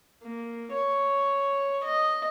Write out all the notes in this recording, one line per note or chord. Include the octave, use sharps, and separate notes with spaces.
A#3
C#5
D#5